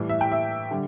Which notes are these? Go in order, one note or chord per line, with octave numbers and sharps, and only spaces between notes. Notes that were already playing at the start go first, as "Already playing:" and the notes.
Already playing: A2 E3 G3
E5
G5
E5
D3 G3